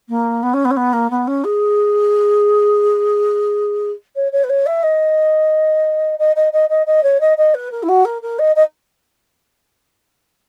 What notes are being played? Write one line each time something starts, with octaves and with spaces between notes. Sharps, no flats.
A#3
B3
C#4
B3
C#4
B3
A#3
B3
C#4
G#4
C#5
C#5
B4
C#5
E5
D#5
D#5
D#5
D#5
D#5
D#5
C#5
D#5
D#5
B4
A#4
E4
F#4
A#4
A#4
D#5
D#5